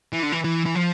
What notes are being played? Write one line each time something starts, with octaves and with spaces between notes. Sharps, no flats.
E3
D3
E3
E3
E3
F3